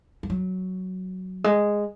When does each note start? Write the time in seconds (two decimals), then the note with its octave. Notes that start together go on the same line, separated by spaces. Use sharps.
0.23 F3
0.30 F#3
1.44 G#3